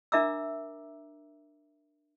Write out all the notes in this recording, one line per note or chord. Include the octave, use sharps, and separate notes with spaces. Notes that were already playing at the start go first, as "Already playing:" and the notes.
D4 A#4 E5 A#5 D6 E6